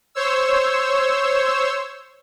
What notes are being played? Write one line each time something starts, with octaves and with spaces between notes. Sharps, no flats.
C5 C#5 E6